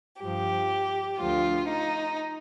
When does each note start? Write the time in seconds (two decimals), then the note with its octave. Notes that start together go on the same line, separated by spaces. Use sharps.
0.20 G2 F3 G4
1.18 D2 D3 F3 F4
1.67 D#4